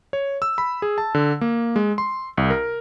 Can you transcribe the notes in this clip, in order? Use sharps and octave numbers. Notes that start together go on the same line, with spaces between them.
C#5
E6
B5
G#4
A5
D3
A#3
G#3
C6
C2
A#4